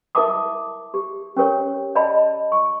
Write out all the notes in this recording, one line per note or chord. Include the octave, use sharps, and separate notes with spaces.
E4 A#4 E5 A5 D6 D#6
G4
C#4 G4 A#4 C#5
D5 D#5 A5 B5
C#6